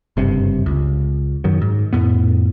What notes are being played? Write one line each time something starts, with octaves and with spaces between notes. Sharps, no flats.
F#1 G2 C3
C#2
F#2 D#3 F#3
G#2
F2 A2 B3